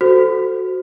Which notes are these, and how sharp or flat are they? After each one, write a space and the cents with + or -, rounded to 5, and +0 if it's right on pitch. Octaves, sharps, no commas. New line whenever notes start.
F#4 +5 A4 +0 C5 -15